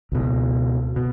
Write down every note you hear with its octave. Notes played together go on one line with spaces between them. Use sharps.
C#2 B2
B2